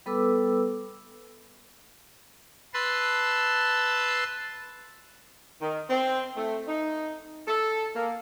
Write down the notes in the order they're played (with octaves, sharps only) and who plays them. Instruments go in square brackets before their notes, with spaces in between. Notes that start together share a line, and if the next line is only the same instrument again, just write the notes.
[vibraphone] G3 B3 A4 B4 D6 E6
[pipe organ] B4 A5 C6 E6
[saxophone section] D#3
C4
A3
D#4
A4
A#3